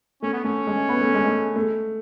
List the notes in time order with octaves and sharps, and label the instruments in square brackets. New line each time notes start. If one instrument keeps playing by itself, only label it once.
[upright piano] A3 [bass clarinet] C#4
[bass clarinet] B3
[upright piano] A3 [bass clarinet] C#4
[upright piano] G#3
B3
A3
G#3
A3
A3